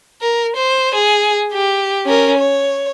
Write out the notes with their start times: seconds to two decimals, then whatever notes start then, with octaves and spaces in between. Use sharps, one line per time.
0.22 A#4
0.56 C5
0.94 G#4
1.53 G4
2.06 C#4 A#4
2.38 C#5